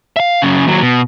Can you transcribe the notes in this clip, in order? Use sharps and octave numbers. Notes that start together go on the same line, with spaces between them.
E5 F5
F#2 C#3
D#2 F#3
B2